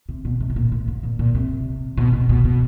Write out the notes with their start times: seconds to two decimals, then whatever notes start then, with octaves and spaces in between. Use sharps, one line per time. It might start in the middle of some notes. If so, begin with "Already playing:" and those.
0.09 C3
0.25 B2
0.40 C3
0.50 A2
0.56 A#2
0.72 A2
0.88 G#2
1.03 A#2
1.19 A#2
1.35 C3
1.97 B2
2.13 B2
2.29 B2
2.45 B2